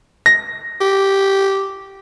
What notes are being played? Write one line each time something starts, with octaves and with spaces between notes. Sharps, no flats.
A#6
G4